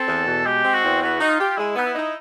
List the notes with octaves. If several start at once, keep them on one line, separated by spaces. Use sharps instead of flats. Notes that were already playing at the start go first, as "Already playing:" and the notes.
Already playing: C4 A4
E2
B2
G#3 G4
C4
F#4
E2
B3 F#4
D#4
F4
G4
G#3 E4
B3 D#4
E4
D#4